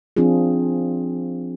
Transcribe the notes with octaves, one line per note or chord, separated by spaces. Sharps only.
F3 C4 D4 F4 G#4